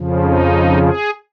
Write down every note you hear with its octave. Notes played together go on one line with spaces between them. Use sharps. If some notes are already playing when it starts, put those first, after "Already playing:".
Already playing: F2 C#3 F3
D#4
G#4